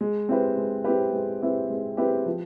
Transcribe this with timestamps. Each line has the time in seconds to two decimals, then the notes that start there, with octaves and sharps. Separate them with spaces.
0.01 G#3
0.29 C4 E4 G4 B4
0.57 G#3
0.84 C4 E4 G4 B4
1.13 G#3
1.42 C4 E4 G4 B4
1.70 G#3
1.97 C4 E4 G4 B4
2.26 F3